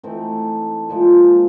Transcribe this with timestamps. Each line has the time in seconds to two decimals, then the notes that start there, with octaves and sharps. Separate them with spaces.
0.03 E3 A3 C4 D#4
0.89 A#2 F3 G#3